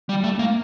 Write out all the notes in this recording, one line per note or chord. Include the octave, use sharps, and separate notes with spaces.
G3
A3
A#3